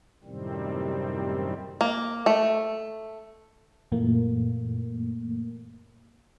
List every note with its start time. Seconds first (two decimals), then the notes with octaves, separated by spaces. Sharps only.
0.24 F#2 A2 C3 D#3 G3 C4
1.81 A#3
2.26 A3
3.92 F#2 A#2 E3 A3 A#3